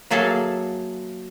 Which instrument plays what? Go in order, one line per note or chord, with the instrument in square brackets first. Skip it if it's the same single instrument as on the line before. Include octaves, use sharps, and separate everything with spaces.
[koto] F#3 A#3 G#4 A4 E5 F5